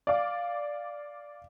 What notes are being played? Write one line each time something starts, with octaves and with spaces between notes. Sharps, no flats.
D5 F5 D6